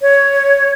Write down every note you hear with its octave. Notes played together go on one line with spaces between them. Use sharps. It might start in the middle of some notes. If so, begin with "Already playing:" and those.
C#5